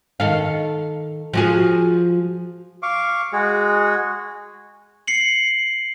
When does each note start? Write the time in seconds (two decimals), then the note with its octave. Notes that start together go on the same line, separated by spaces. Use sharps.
0.20 D#3 A4 F5
1.33 F3 F#4 G#4
2.83 F5 C#6 D6
3.33 G#3 F#4 G#4
5.07 C7 C#7 F#7